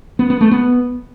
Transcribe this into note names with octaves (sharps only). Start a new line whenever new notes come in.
B3
B3
A3
B3